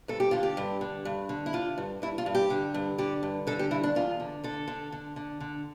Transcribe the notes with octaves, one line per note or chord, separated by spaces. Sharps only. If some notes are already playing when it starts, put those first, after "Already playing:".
G2 A4
G4
D3 F4
G4
G2
D3
G2
D3
E4
D3 F4
G2
G2 E4
F4
G2
G4
D3
G2
D3 G4
G2
D3 A4
G4
G2 E4
D4
E2 F4
D3
D3 A4
D3
D3
D3
D3